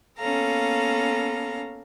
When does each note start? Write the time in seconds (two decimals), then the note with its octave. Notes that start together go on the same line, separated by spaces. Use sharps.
0.18 A#3 B3 C#4 A4 F5 A#5